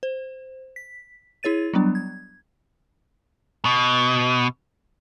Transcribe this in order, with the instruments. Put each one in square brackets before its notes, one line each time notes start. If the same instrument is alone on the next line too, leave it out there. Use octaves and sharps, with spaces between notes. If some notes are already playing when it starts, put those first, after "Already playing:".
[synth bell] C5
B6
E4 G#4 C#5 A6 D#7
F#3 G3 B3 D4
G#6
[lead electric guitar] B2